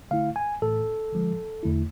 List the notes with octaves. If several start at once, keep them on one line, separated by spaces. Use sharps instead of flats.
D3 A3 E4 F5
G#5
A2 E3 A3 A4
D3 F3 G#3
E2 D3 A3 E4